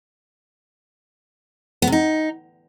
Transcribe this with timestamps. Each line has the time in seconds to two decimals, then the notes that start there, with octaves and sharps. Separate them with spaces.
1.82 B3
1.87 C3
1.92 D#4